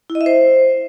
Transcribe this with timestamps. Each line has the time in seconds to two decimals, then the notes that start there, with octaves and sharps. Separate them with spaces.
0.10 E4
0.15 D#5
0.21 E5
0.26 C5